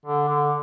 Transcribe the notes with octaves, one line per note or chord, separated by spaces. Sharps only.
D3
D3